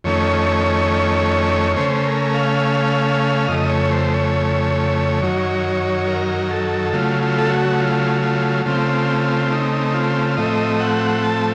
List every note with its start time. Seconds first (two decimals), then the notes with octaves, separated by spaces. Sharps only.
0.04 F2 D#3 A3 C#4 C#5
1.76 C#3 A3 C#4 C5
2.06 A#4
2.34 F5
3.48 F2 C#3 A3 D#5
3.70 C#5
3.92 C5
4.14 C#5
5.21 F#2 D#3 F#3
6.07 A#4
6.50 A4
6.93 C#3 F#3 A3 F4
7.22 F4
7.38 A4
7.50 F#4
7.80 F4
8.22 F4
8.65 C#3 A3 C4 F4
9.52 D#4
9.94 F4
10.37 A2 F3 A3 C4 D#5
10.80 F#5
11.23 A5